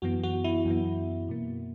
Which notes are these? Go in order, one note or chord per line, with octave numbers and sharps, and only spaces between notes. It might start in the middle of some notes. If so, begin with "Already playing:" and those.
F#2 E3 B3 F#4
F#4
E4
F#2 E3 B3
B2 A#3